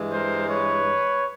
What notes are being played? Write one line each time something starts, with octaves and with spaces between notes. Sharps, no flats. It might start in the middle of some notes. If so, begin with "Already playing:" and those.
Already playing: G2 E3 G#3
A#4 C5
B4 C#5